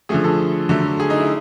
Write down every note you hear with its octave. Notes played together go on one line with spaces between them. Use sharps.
D3 F3 A3 G#4
A4
D3 F#3 A3
G#4
D#4
E4